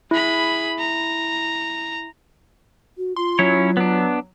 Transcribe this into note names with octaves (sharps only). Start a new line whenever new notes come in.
E4 G#4 B5
A#5
F#4
F4 C6
F#3 C#4 E4 C#5
B3 D4